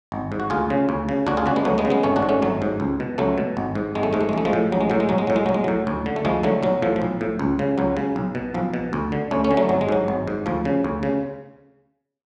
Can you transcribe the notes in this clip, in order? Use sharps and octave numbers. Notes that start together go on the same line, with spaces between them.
G#1
G#2
F#4
D2 F4 G#4
C#3
D2
C#3
D2 D4 F#4
F4 G#4
C#3 D4 F#4
G#3 B3
D2 F#3 A3
G#3 B3
C#3
G#3 B3
G#1 A3 C#4
D4 F#4
G#2
A3 C#4
G#1 F#3 A3
G#2
C#2
B2
C#2 F#3 A3
B2
G#1
G#2
G#1 G#3
A3
G#2 G#3
A3
G#3
A1 A3
F3 G#3
A2
A1 F#3
G#3
A2 F#3
G#3
B1 F#3
G#3
A2 F#3
G#3
B1 F#3
G#3
A2 F#3
D2
D3
A3
D2 F3 G#3
D3 F#3 A3
B1 F#3
A2 F3
F3
B1
A2
C#2
C#3
C#2 F#3
C#3
B1
B2
B1 F3
B2
D2
D3
D2 A3 C#4
A3 C#4
D3
F#3 A3
G#1 F#3
G#3
G#2 F#3
G#1
G#2
D2 F3
C#3
D2
C#3